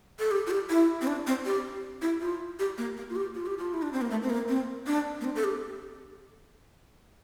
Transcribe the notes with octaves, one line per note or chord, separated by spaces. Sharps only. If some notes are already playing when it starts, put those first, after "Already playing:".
A4
G4
F4
G4
E4
C4
D4
C4
G4
E4
F4
G4
A#3
A#3
F4
G4
F4
G4
F4
E4
D4
C4
A#3
A3
C4
A#3
C4
D4
A#3
C4
A4
G4